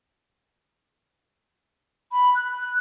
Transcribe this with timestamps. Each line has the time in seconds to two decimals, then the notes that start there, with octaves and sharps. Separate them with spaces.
2.12 B5
2.35 F#6